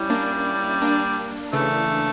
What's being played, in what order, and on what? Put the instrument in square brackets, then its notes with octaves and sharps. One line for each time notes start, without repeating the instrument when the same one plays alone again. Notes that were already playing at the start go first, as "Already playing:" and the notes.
Already playing: [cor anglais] G3 [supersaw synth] C#4 E4
[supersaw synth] A#3 D4
A#3 D4
[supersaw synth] C#3 E3 [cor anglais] A3